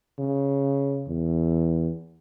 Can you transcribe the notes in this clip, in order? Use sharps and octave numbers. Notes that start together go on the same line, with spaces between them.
C#3
E2